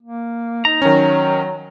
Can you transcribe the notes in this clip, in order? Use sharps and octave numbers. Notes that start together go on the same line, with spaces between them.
A#3
D#4 A#5
D#3 F#3 C#4